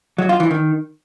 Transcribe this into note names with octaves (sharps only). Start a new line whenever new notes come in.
F#3
F4
E3
D#3